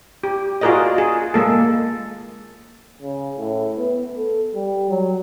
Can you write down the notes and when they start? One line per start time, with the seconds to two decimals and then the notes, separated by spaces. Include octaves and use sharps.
0.24 G4
0.61 F4 F#4 G#4 A#4 D5 D#5
0.98 G#4
1.34 G#3 A#3 A4
3.02 C#3
3.38 A2
3.77 B3
4.17 A4
4.55 G3
4.90 F#3